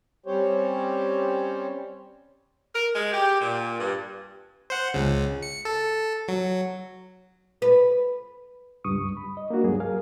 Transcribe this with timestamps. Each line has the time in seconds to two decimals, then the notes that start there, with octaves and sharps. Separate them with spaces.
0.26 G3 C4 C#4 G4 C5 C#5
2.74 A#4
2.95 G#3
3.12 G4
3.41 A#2
3.79 G2
4.70 C5 F#5
4.94 C#2 C#3
5.43 C#7
5.65 A4
6.28 F#3
7.62 B4
8.84 C#2 G2 C#6 D#6
9.17 B5
9.37 D#5
9.50 A#3 D4 F#4
9.63 C#2 G2 F#3 G#4
9.80 A#4 F5 G#5